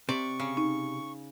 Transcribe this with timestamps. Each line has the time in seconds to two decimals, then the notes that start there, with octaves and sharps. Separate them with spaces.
0.09 C3 D5 C#6
0.40 C#3
0.57 D#4